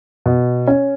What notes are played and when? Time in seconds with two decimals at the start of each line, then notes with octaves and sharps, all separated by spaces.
0.26 B2
0.67 C#4